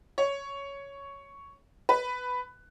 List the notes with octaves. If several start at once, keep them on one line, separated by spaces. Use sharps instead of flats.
C#5
B4